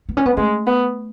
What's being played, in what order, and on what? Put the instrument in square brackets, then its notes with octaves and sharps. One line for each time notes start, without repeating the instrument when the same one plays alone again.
[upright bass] B3
C#4
B3
[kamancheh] G#3 [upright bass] A3
[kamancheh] B3